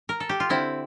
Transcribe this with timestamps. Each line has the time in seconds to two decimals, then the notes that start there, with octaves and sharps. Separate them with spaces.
0.09 A#4
0.20 A4
0.29 G4
0.40 F4
0.49 D3 C4 E4